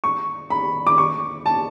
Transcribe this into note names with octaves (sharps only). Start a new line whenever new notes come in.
C#6
B5
D6
C#6
A5